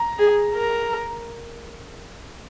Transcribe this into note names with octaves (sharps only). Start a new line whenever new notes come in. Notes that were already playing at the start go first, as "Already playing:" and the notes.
Already playing: A#5
G#4
A#4